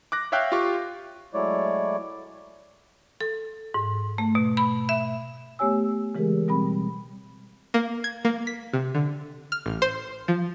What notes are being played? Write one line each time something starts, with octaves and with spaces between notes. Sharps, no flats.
D6 F#6 A#6
C#5 E5 F5 G5 F#6 G6
F4 G4 F5 C#6 D6
F#3 G#3 A3 E4 C#5 D5
A4
G#2
A3
B2
B5
E5
A3 B3 G4 C#5 G#5 E6
C#3 E3 G#3 G4 G#4 A#4
B2 G3 C4 B5
A#3
G#6
A#3
B6
C3
D3
F6
A1
C5
F3